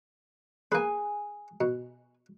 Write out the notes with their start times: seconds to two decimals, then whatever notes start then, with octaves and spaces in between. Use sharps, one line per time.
0.72 A#3 G#4 B4 G#5
1.61 B2